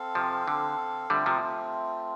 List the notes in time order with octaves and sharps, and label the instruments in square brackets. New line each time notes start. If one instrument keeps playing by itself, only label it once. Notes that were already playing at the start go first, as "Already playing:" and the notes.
Already playing: [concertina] C4 A4 F5
[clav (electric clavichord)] C3 F3
D3
[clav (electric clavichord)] D3 G3 [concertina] A3 C4 F4
[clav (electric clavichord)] C3 F3